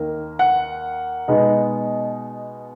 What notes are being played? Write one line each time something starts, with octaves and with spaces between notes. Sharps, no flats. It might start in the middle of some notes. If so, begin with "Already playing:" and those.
Already playing: D#2 D#3 A#3
F#5
B2 G#3 B3 D#4